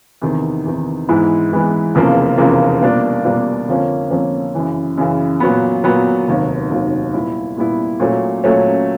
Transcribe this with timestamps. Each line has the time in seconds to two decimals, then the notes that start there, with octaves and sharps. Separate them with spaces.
0.22 E2 C3 D#3
0.65 E2 C3 D#3
1.09 G#2 E3 G#3 B3 E4
1.52 G#2 E3 G#3 B3 E4
1.95 F1 E2 C#3 F3 A#3
2.38 F1 E2 C#3 F3 A#3
2.82 B2 G3 A#3 D4 F4
3.24 B2 G3 A#3 D4 F4
3.68 F2 D3 F3 A#3 C#4
4.11 F2 D3 F3 A#3 C#4
4.55 F#2 C#3 E3
4.98 F#2 C#3 E3
5.40 A#2 F#3 B3
5.84 A#2 F#3 B3
6.28 F1 D#2 D#3 F#3
6.71 F1 D#2 D#3 F#3
7.13 A#2 G3 B3 E4
7.57 A#2 G3 B3 E4
8.00 A#2 F#3 A3 C#4
8.44 A#2 F#3 A3 C#4